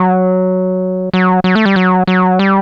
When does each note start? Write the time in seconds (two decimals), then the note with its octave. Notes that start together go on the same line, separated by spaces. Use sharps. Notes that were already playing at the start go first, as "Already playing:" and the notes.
Already playing: F#3
1.14 F#3
1.44 F#3
1.55 A3
1.65 G3
1.76 F#3
2.07 F#3
2.39 G3